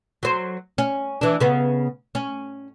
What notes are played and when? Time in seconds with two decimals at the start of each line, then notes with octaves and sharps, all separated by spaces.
0.23 F#3 C5
0.78 C#4
1.21 E3 D4
1.40 C#3 B3
2.15 C#4